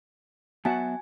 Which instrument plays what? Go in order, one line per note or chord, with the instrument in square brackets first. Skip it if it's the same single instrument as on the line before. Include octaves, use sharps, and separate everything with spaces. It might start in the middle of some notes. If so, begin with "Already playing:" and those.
[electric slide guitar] F#3 B3 E5 [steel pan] F#4 F#5 A5 [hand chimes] G#5